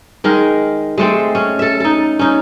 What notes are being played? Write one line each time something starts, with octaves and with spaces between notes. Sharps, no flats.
D#3 G#3 A#4
G#3 A3 C4
C#4
A4 E5
D#4 A4
C#4 D#4